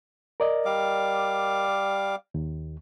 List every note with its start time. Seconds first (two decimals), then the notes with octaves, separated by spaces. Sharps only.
0.40 A#4 D5 D#5
0.65 G3 F5 D6
2.34 D#2